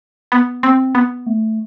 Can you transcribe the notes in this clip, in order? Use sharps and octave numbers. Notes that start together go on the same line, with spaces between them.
B3
C4
B3
A3